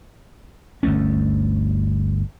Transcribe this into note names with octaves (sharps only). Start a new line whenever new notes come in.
G1 D2 A3 C#4